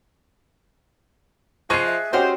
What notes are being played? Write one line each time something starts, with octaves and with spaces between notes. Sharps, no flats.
F3 G#4 D#5 C#6 F#6 C7
E5
G#3 C4 C#4 F#4 G4 C5 F6